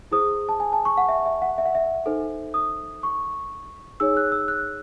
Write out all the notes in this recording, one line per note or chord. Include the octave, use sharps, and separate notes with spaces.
E4 G#4 C5 D#6
A5
G#5
A5
C#6
F#5
E5
E5
F#5
E5
F#5
E5
D#4 A4 C5
D#6
C#6
D#4 G#4 C#5 E6
F#6
E6
F#6